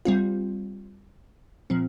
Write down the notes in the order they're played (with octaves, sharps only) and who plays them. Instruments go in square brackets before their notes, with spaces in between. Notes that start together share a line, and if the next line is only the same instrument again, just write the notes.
[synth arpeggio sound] G3 C4 F4
A#2 F3 C4